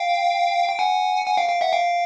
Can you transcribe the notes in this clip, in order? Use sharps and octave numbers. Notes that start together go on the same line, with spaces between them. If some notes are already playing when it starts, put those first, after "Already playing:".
Already playing: F5 G5
G5
F#5 G#5
F#5 G#5
F5 G5
F5 G5
E5 F#5
F5 G5